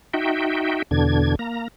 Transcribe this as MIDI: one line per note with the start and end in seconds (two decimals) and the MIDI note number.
0.14 0.82 63
0.14 0.82 66
0.14 0.82 76
0.14 0.82 79
0.91 1.35 40
0.91 1.35 47
0.91 1.35 50
0.91 1.35 62
0.91 1.35 92
1.39 1.68 58
1.39 1.68 82